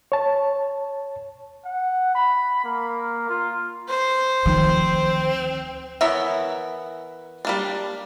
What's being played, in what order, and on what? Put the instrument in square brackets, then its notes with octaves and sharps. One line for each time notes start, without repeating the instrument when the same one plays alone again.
[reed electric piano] C#5 A5
[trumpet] F#5
B5
A#3
F4
[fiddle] C5
[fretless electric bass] D2 F3 [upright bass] D#3 [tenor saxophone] C4
[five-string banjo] E3 B3 A#4 C#5 E5
G3 A#3 D4